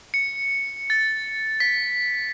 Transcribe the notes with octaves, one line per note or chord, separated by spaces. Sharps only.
C#7
A6
B6